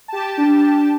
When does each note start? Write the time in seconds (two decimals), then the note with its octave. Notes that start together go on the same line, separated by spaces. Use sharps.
0.08 G4 A5
0.37 D4